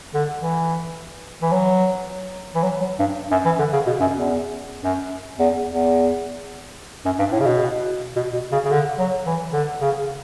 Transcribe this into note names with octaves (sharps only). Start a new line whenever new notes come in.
D3
E3
E3
F#3
E3
F#3
F#3
G2
F#2
E3
D3
C#3
B2
F#2
E2
F#2
E2
E2
F#2
G2
A2
C#3
B2
B2
B2
C#3
C#3
D3
F#3
E3
D3
C#3